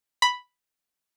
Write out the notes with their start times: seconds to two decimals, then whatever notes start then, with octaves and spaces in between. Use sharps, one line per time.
0.22 B5